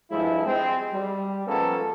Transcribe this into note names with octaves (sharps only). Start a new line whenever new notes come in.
G2 F3 G#3 E4
G#3 C4
G3
F3 G#3 A#3 B3 C#4 A4